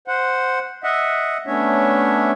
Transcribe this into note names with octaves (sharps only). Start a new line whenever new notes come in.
C5 F#5
D#5 E5 F#5
A3 B3 C#4 D4 C#5 E5